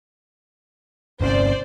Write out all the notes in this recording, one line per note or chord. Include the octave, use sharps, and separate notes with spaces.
G1 C3 C#4 C5 D5